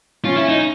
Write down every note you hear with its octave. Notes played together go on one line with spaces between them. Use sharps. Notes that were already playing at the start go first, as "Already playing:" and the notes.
C#4 F4
E4
D#4